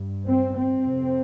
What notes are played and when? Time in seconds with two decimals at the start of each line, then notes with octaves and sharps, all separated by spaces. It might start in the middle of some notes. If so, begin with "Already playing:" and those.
Already playing: G2
0.27 C4
0.55 C4
0.83 F2 C3